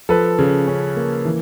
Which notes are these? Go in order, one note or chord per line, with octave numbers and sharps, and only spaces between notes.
F3 A4 B4
C#3
C#4
A#3
E3